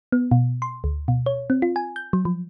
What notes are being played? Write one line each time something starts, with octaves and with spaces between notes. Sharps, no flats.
B3
B2
C6
D2
B2
C#5
C4
F4
G#5
G6
F#3
F3